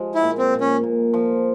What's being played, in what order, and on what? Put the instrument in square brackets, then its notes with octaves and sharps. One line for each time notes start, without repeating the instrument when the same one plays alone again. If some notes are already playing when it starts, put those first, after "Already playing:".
Already playing: [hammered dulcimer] F3 G#3
[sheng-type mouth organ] E4
[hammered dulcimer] A#2
[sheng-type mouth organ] C4
[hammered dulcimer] A#2
[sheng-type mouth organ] C#4
[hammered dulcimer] A#2
F3